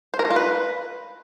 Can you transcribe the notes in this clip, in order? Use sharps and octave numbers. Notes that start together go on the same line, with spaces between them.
C5
A#4
A4
F4
B4